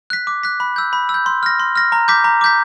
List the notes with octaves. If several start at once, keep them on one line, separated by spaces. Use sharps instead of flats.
F#6 B6
D6
F#6 B6
B5
E6 G6
B5
E6
G6
C6
F6 A#6
C6
F6 A#6
A#5
D6 G6 B6
A#5
D6 G6 B6